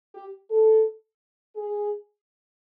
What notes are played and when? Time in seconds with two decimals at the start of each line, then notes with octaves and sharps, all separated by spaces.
0.15 G4
0.50 A4
1.56 G#4